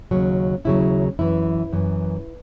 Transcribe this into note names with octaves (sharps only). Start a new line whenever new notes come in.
D#2 C#3 F#3
D#2 C#3 F#3 E4
F#2 E3 E4
F#2 E3